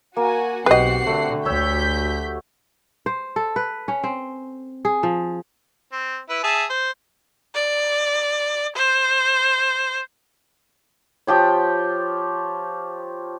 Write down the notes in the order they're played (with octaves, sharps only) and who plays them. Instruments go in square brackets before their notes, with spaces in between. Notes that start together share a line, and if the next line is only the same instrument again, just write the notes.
[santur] A#3 [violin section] F#4 G#5
[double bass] B1 [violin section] C4 F#5 C7 [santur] F#4 G4 [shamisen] B4 D#5
[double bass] D3 [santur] A3
[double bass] D2 [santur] C#5 E6 [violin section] G6 B6
[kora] C5
A4
B4
C#4
C4
G#4
F3
[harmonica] C4
E4 B4
G#4 E5 A5
C5
[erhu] D5
C5
[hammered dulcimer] F3 G4 C#5